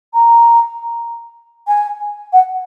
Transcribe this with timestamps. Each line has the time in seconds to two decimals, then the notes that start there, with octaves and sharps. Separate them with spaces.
0.14 A#5
1.67 G#5
2.33 F#5